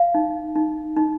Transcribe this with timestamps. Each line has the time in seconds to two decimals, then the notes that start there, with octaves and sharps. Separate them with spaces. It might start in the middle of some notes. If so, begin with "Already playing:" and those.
Already playing: F5
0.15 D#4
0.55 D#4
0.97 D#4